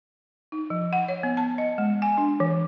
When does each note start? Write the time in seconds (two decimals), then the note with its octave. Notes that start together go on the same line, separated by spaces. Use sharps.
0.52 D#4
0.70 F3
0.93 F#5
1.09 C#5
1.23 B3
1.37 A5
1.58 D#5
1.78 G#3
2.02 G#5
2.17 D4
2.40 E3